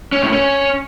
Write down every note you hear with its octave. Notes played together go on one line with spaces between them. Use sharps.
C#4
A2
C#4